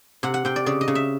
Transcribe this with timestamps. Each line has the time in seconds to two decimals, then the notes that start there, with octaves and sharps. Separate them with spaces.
0.23 C3 F#5
0.34 F#5
0.45 C3 G5
0.56 D5
0.66 C#3 D5
0.81 D#5
0.88 C#3
0.95 E5